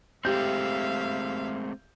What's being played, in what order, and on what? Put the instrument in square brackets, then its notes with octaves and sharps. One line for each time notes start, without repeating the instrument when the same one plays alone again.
[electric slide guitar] G#3 A3 C4 [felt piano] G4 G6 [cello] E5 F5